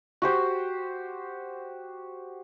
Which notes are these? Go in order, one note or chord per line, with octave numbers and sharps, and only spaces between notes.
F#4 G4 C5